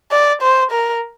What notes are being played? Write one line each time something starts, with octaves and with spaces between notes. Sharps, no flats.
D5
C5
A#4